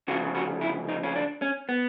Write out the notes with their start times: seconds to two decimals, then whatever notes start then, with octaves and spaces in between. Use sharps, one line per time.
0.08 D2 C#3 F3 F#4
0.35 F#4
0.61 E4
0.88 D#4
1.03 C#4
1.15 D4
1.42 C#4
1.69 B3